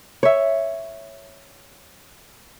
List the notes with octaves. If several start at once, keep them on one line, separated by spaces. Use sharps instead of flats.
C#5 E5